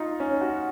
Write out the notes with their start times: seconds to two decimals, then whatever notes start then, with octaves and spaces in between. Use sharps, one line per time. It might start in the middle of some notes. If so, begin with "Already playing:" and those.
Already playing: D#4 F4
0.20 C#4
0.41 F#4